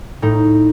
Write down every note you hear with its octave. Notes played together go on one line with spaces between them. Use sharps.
A2 D#4